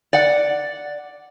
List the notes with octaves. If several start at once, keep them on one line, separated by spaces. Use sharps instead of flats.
D5 F#5